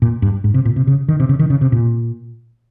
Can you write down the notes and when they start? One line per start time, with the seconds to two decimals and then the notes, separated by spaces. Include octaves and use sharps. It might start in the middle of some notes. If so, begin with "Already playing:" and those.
0.02 A#2
0.22 G2
0.44 G#2
0.54 C3
0.65 A#2
0.76 C3
0.87 C#3
1.08 D#3
1.20 C3
1.29 C#3
1.39 D#3
1.50 C#3
1.61 C3
1.72 A#2